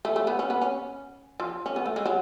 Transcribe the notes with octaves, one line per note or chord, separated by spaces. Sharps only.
A3
A3
B3
C#4
B3
C#4
F3
C#4
B3
A3
G#3
F#3